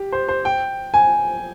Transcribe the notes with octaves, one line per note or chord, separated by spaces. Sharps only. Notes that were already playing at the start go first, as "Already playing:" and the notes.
Already playing: G4
C5
C5
G5
G#5